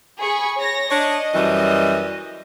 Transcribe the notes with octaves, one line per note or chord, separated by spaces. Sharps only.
G#4 B5 C#6
C#5 A#6
D4 C#5 D#5
F#2 E3 G3